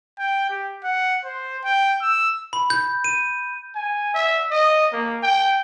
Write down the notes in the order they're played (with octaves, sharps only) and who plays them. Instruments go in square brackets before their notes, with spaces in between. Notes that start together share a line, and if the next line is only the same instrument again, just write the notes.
[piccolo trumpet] G5
G4
F#5
C5
G5
E6
[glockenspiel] B5
G6
D#7
[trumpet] G#5
E5
D#5
A#3
G5